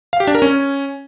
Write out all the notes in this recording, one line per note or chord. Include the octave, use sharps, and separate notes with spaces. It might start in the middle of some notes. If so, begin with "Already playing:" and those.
F5
G4
D4
A#4
C#4